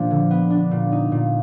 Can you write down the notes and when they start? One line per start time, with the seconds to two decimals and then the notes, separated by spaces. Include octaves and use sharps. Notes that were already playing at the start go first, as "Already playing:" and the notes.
Already playing: A#2 F3 A#3 D4
0.11 D3
0.31 B3
0.50 D4
0.71 A#2
0.92 D#4
1.12 A#2